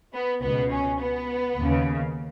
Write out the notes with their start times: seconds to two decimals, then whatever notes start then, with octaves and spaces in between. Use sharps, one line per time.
0.13 B3
0.42 C#2 B2 B3
0.71 C#4
1.00 B3
1.57 D#2 C#3